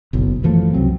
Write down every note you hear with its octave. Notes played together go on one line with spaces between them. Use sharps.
F#1 B1
F#2 E3 F3 A3
C#2 C3 F#3 C4